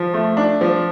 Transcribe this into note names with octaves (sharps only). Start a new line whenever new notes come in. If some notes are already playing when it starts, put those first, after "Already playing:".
Already playing: F3
A3
D4
F3